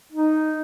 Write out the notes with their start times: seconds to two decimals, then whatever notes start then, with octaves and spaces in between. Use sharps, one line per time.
0.12 D#4